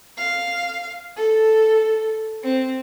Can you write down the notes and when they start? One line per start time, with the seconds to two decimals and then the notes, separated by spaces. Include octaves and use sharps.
0.17 F5
1.17 A4
2.43 C4